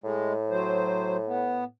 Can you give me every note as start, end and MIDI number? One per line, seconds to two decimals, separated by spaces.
0.04 1.71 45
0.04 0.33 56
0.50 1.16 54
0.50 1.16 72
1.27 1.64 59